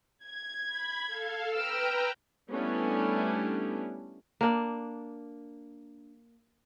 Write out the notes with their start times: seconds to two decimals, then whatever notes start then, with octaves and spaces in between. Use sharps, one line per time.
0.25 G#6
0.66 B5
1.06 A4 F5
1.53 B4 G5 A#5 E6 F6 D7
2.52 G3 A3 B3 C#4 D4 E4
4.41 A#3 D4